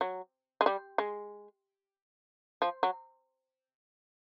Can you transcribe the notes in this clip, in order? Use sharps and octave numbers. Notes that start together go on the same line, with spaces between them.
F#3
G#3
G3
G#3
F3
F#3